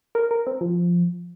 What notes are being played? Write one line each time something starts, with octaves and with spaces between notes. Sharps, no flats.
A#4
A#4
C4
F3